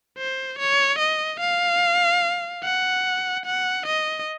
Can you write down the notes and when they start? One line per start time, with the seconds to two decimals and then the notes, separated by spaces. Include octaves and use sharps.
0.18 C5
0.59 C#5
0.99 D#5
1.40 F5
2.63 F#5
3.45 F#5
3.86 D#5